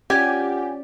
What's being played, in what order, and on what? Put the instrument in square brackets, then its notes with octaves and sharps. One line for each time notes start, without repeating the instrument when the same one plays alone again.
[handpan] C#4 D5 [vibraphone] F4 F#5 [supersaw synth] G4 [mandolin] G#5